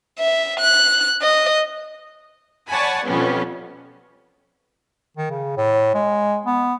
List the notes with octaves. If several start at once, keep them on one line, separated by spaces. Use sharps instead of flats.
E5
F#6
D#5
C#5 D5 F#5 G#5 A5 B5
F2 B2 F3 G3 B3 C#4
D#3
C#3
A2
G#3
B3